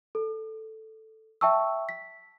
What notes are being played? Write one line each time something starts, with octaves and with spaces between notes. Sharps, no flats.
A4
E5 G5 A5 C#6 E6
B6